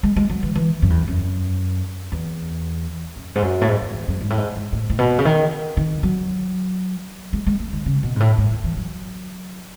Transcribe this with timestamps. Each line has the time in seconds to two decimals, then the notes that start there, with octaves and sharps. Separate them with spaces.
0.03 G#3
0.16 G#3
0.29 F#3
0.43 E3
0.55 E3
0.82 F#2
0.90 E2
1.08 F#2
2.12 E2
3.16 F#2
3.35 G#2
3.42 F#2
3.61 A2
3.69 G#2
3.82 G#2
3.94 E2
4.08 F#2
4.21 G#2
4.30 A2
4.38 G#2
4.56 G#2
4.73 A2
4.90 A2
4.99 B2
5.19 C#3
5.25 D#3
5.77 D#3
6.03 F#3
7.33 G#3
7.47 G#3
7.60 A3
7.73 D#3
7.86 C#3
8.03 B2
8.16 G#2
8.20 A2
8.38 G#2
8.51 A2
8.64 E3
8.77 F#3